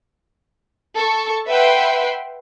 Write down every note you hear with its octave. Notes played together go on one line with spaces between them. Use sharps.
A4 C#6
B4 E5 F#5 G5 B5 C6